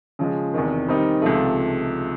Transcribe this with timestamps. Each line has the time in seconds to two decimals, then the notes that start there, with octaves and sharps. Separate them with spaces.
0.19 C#3 F3 G#3
0.54 E2 C3 D#3
0.88 D#3 G3 C4 D#4
1.22 C#2 C3 F3 A3